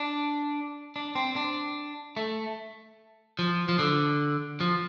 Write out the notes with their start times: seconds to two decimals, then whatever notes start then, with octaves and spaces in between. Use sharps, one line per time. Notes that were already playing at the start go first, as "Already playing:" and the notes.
Already playing: D4
0.96 D4
1.15 C4
1.36 D4
2.17 A3
3.39 F3
3.69 F3
3.79 D3
4.61 F3